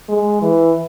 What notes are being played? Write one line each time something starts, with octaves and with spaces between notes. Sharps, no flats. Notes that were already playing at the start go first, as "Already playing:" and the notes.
G#3
E3